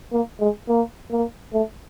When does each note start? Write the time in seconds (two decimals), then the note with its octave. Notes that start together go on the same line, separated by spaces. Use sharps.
0.13 A#3
0.40 G#3
0.69 A#3
1.11 A#3
1.53 A3